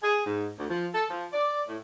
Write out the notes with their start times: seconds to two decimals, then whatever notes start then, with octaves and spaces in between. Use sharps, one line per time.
0.03 G#4
0.26 G#2
0.58 D2
0.70 F3
0.94 A4
1.10 F3
1.33 D5
1.68 A2